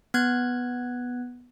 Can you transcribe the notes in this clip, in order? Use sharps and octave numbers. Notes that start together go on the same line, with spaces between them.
B3 F#6 G#6